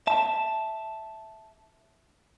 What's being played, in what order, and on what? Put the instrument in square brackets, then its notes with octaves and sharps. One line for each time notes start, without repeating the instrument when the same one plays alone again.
[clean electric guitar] E5 A5